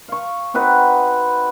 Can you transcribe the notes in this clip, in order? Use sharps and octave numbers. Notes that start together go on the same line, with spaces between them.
F5 C#6
C4 D#4 F#4 B4